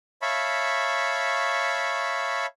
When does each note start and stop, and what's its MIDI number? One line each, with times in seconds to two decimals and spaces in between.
0.22 2.46 73
0.22 2.46 76
0.22 2.46 77
0.22 2.46 81
0.22 2.46 83
0.22 2.46 85